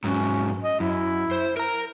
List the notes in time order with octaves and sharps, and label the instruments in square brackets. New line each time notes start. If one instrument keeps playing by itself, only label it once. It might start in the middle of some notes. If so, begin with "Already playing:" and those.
[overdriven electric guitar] G#2 F#3 [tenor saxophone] C#4
[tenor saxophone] D#5
[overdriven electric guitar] F#2 [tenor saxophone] E4
[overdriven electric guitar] C5
A#4 A#5